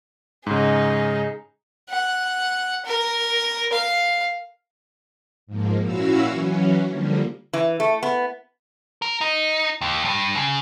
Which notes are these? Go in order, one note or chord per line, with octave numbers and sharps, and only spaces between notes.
G#2 C#3 D#4 G#4
F#5
A#4
F5
G#2 F3 A#3
A#2 C#4 E4 F#4 F5 E6
E3 F#3 C#4
D3 F3 G3 A#3
E3
A3
B3
A#4
D#4
D#2
G2
C#3